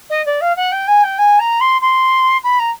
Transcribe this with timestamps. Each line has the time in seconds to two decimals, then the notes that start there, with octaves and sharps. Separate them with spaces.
0.10 D#5
0.25 D5
0.41 F5
0.56 F#5
0.71 G5
0.87 G#5
1.03 G5
1.18 G#5
1.39 A#5
1.60 C6
1.81 C6
2.43 B5
2.59 A#5